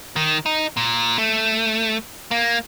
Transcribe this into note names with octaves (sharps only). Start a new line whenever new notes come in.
D#3
D#4
A#2
A3
A#3